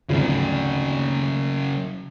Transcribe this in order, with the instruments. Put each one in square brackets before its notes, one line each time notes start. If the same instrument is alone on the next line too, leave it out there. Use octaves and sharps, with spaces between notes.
[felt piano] G#1 D2 F3 [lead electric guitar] C#3 F#3